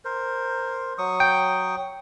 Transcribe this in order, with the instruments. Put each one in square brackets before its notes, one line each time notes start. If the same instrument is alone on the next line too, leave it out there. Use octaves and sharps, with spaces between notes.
[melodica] A#4 C5
F#3 C#6 D#6
[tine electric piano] G5